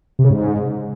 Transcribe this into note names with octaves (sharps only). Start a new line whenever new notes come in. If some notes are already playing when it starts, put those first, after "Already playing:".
C3
C#3
G#2